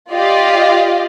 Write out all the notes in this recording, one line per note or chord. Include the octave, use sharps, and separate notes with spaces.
F4 G4 D5 D#5 F5